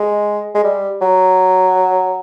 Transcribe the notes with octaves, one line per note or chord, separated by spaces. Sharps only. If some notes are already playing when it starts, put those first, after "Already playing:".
Already playing: G#3
G#3
G3
F#3